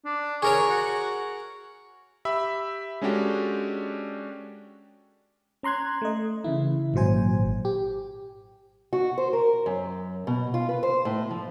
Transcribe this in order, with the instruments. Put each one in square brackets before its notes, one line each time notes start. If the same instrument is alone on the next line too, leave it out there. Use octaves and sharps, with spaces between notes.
[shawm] D4
[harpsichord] G#4 A#4 C#5 [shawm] C#6
[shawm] F#4
[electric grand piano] G4 E5 B5 E6
G#3 C#4 D4 F#4 G4 A4
[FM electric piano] C#4 A#5 C6 F#6 G#6
A3 D#5
C#3 E3 E4
G#1 A#2 F#3 C5 G#5
G4
[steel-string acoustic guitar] F#4
C5
A#4
F#2
B2
F4
B4
C5
A2
F3